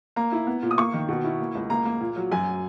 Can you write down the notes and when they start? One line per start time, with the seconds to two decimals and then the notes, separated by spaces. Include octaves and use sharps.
0.16 A#3 A#5
0.32 E4
0.47 B3
0.63 A#2
0.71 D#6
0.78 A#3 C#6
0.93 D#3
1.09 B2
1.24 E4
1.39 A#3
1.55 C#2
1.70 A#3 A#5
1.86 A#3
2.01 A#2
2.16 F#3
2.32 F#2 G#5